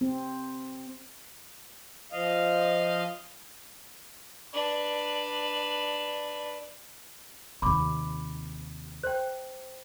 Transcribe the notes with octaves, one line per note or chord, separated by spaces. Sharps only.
C4
F3 D#5 F5
D4 B4
D#2 C3 B5 D6
C5 G5